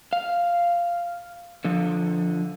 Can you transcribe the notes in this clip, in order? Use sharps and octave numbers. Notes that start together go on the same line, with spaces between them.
F5
D3 F3